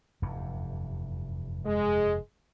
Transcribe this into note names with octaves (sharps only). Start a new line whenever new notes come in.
F1 E2 G2
G#3